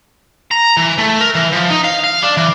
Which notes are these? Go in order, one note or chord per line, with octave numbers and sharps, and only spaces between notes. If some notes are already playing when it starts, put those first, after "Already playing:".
A#5
E3
A3
A#4
E3
F3
D#4
F5
F5
D4
E3